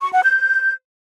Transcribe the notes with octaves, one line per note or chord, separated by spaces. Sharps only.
C#6
F#5
G6